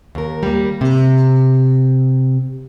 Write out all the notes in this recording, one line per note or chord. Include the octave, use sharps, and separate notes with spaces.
D#2 A#4
G3 A#3
C3